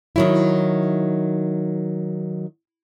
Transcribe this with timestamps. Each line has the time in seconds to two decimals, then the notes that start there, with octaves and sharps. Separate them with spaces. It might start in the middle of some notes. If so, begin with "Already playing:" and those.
0.16 D#3 F#3 E4